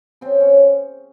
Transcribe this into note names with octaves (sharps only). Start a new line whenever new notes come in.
C#3 C4
C#4